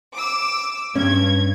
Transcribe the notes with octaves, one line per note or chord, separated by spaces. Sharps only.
D6 E6
G2 C#4 G#6